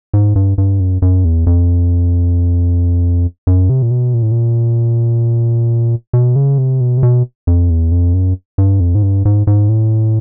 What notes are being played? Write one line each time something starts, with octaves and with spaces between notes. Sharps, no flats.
G#2
G2
G2
F#2
F#2
E2
F2
F#2
C3
A#2
B2
A#2
A2
A#2
B2
C#3
C3
B2
C3
B2
F2
E2
F2
F#2
G2
F2
G#2
G2
G#2
G#2
A2